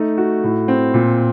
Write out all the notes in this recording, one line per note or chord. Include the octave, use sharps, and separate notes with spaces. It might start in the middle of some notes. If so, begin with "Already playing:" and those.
Already playing: A3 D#4
F#4
A2
C4
A#2